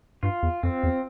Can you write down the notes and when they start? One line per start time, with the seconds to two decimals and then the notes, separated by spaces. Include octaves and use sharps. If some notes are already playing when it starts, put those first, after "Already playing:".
0.23 G2 F4
0.43 E2
0.63 F2 C4
0.83 E2